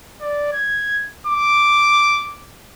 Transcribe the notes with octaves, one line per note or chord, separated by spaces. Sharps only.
D5
G#6
D6